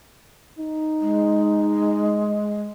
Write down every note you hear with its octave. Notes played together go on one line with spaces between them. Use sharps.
D#4
G#3